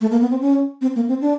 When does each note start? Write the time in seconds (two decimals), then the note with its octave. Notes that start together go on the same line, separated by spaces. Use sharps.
0.01 A3
0.11 A#3
0.21 B3
0.31 C4
0.41 C#4
0.81 C4
0.95 A#3
1.09 C4
1.21 D4